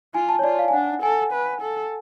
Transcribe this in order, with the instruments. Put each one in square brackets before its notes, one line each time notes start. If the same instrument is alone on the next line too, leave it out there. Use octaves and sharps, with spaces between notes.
[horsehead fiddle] F4 [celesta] G#5
[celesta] A5
C#5
[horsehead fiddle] F4 [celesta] D5
[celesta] F5
G#5
[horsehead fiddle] D4 [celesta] F#5
[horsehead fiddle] A4 [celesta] G#5
[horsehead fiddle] B4
A4